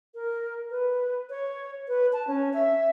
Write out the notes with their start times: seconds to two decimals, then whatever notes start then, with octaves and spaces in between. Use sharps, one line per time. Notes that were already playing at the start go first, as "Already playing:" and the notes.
0.15 A#4
0.70 B4
1.30 C#5
1.88 B4
2.13 A5
2.28 C#4
2.54 E5